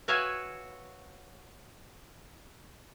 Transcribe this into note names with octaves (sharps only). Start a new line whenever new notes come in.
F#4 B4 C#5 E5 F5 G#5